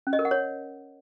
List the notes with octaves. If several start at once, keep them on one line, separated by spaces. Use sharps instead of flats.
C#4
D#5
A#4
F#5
C#5